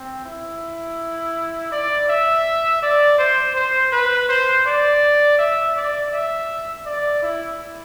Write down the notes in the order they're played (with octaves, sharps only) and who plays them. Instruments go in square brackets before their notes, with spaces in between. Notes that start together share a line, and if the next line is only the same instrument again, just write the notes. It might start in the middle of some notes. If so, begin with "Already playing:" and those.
Already playing: [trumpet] C4
E4
D5
E5
D5
C5
C5
B4
C5
D5
E5
D5
E5
D5
E4